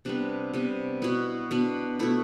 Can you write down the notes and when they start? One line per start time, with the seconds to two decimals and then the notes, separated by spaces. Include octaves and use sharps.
0.05 C3 G3 B3 D4
0.54 C3 G3 B3
1.02 B2 B3 E4
1.51 B2 B3 D4
1.99 B2 A3 E4